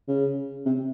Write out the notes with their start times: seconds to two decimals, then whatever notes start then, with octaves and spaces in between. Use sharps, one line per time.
0.08 C#3
0.66 C3